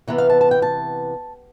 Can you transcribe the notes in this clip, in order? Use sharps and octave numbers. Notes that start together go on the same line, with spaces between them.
C3 E3 B3
F5
A5
A5
G5
A5